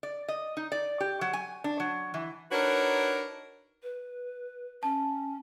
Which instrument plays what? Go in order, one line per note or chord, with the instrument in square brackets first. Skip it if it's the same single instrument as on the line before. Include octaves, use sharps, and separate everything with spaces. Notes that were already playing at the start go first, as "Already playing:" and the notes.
[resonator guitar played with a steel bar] D5
D#5
D#4
D5
G4
F#3
G#5
D4
F#3
E3
[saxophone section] D4 D#4 F#4 A#4 B4 C#5
[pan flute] B4
[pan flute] C#4 [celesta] A5